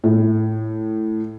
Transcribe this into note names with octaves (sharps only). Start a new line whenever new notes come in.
A2